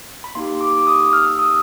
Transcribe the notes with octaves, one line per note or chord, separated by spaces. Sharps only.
B5
A#3 D#4 G4 C6
D6
D6
D#6
F6
E6
D#6